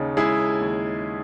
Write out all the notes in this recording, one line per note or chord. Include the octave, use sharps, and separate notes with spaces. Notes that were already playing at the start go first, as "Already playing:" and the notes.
Already playing: D#2 C#3 D#4
G#3 E4 G#4
D#2